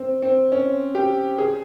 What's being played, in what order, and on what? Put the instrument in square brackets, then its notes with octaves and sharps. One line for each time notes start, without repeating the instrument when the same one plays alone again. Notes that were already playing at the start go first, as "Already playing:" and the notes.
Already playing: [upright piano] C4
C4
C#4
G4
G#4